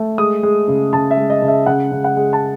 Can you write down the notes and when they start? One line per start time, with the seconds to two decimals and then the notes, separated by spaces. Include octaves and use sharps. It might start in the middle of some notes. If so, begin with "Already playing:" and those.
Already playing: A3
0.18 G#3 D#6
0.43 G#3
0.68 C#3
0.93 C#3 A5
1.11 E5
1.17 G#3
1.30 D#5
1.42 C#3
1.48 E5
1.66 C#3 F#5
1.92 C#3
2.04 F#5
2.17 G#3
2.33 A5